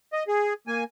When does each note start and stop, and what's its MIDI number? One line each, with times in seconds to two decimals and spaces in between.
0.13 0.23 75
0.28 0.53 68
0.67 0.84 58
0.67 0.84 80